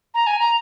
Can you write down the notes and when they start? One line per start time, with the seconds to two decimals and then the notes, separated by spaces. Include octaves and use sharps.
0.14 A#5
0.27 G#5
0.39 A#5